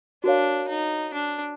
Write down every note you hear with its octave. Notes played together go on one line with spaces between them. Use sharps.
D4 F#4 A#4 C#5 F5
D#4
D4